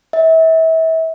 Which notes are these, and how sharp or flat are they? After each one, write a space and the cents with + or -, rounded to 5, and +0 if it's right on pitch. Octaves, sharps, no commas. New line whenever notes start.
E5 -30